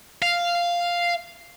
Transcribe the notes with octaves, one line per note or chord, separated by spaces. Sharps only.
F5